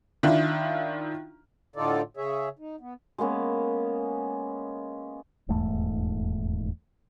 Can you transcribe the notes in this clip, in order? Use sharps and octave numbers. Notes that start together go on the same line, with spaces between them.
D#3 D4 E4 F4
A2 D3 D#4 F4 A4 D5
C#3 G#4 C#5 E5
D#4
B3
G#3 A#3 B3 C#4
D#1 E2 G#2 A3